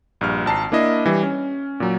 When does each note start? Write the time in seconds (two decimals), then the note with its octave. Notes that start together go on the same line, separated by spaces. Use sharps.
0.21 A#1 G2 F6
0.46 G#1 A5 A#5 C7
0.72 A#3 D4 E4 D#5
1.06 E3 G3
1.23 C#4
1.80 A#2 F#3